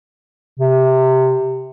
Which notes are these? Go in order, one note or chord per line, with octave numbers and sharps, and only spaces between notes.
C3